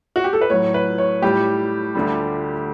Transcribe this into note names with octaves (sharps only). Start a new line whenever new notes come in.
F#4
G4
A4
B4
A2 F#3 C#5
B4
C#5
A2 G3 G4
D2 D3 G3